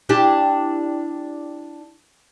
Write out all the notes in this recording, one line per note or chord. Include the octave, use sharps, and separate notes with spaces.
D4 E4 G4